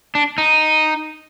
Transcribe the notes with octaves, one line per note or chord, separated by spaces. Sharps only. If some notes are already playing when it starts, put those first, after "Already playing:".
D4
D#4